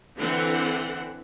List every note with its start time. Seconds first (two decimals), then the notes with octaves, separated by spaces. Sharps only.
0.17 D3 E3 C4 F#5